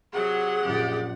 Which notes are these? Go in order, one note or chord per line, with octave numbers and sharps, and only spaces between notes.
C3 F#3 G#4 F#5
A#1 F#2 G4 D5